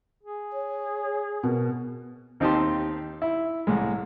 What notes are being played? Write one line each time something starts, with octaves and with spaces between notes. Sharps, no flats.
G#4
C#5
B2 A#4
D#2 C4 D#4 G4 A5 C6
E4
C2 A2 G#3